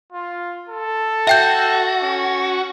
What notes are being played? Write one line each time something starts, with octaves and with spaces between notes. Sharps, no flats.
F4
A4
F#4 E5 G5 G6
C#4